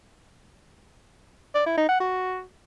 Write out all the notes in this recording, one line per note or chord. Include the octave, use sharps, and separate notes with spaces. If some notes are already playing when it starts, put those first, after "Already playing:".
D5
E4
D#4
F#5
F#4